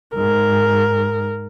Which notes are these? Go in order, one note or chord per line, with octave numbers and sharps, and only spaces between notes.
G#2 A#4